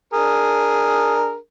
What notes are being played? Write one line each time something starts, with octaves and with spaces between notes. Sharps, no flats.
D4 G#4 A#4